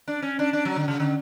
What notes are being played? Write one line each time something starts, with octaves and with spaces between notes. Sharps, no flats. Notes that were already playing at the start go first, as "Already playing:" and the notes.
D4
C#4
D4
D4
F#3
D3
C#3
D3